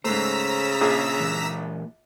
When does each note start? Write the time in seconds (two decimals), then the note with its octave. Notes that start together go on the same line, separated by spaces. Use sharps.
0.04 G#2 C#3 A3 C5 A#5 E6 B6
0.81 A#1 G#4
1.20 A#2 E3